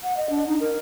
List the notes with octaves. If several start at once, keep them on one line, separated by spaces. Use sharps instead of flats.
F#5
D#5
D4
D#4
A#4